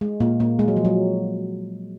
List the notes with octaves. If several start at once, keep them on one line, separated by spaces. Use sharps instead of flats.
G#3
A#2 A#3
A#2 A#3
G#3
F#3
F3
F#3